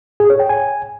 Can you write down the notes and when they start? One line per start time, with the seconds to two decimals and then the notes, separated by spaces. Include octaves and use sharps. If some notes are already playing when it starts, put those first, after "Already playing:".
0.20 G#4
0.30 C#5
0.40 G5
0.49 G#5